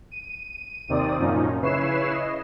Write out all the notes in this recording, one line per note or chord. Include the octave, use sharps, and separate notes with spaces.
D#7
D#2 C3 D#3 C4 D5 D#6
F#2 A#2 F3 C#4 D#4
C#3 E4 B4 C#5 C7 E7
D#5